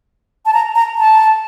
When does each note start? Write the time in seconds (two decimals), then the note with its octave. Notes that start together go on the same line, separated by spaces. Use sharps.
0.46 A5
0.53 A#5
0.75 A#5
0.98 A5